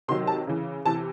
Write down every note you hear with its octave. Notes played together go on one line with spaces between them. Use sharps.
C3 D#3 F#3 C6
A5
C#3 E3
C3 E3 A5